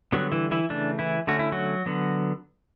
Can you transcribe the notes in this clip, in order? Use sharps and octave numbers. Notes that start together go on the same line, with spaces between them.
D3 F#3 G3 B3 F#4
E3 E4
E3 E4
C#3 E3 A3 D4
E3 E4
D3 A3 C#4 F#4
E4
F#3 F#4
D3 F#3 B3